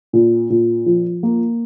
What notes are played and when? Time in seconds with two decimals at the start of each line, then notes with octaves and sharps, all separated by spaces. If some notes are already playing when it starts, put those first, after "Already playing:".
0.13 A#2
0.50 A#2
0.86 F3
1.23 A#3